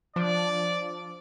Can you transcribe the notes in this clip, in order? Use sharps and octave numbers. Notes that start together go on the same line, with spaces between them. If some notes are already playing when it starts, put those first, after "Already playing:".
F3 D4 D5